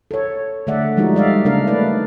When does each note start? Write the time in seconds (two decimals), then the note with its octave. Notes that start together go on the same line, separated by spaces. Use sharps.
0.11 A4 C#5
0.67 D3 A3 D5 E5 F#5
0.97 F3 G3 G#3 D#4 F#4
1.15 G3 D5 E5 F5
1.45 C#3 A#3 D4 A#4 F5
1.67 A3 D#4 B4 D5